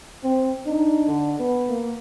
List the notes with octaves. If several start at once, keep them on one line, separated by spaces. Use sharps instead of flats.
C4
D4 D#4
D3
B3
A#3